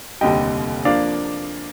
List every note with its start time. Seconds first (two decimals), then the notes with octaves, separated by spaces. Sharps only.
0.21 F1 D#2 D3 G3 D#5 G5
0.85 F3 A#3 D4 D5 F5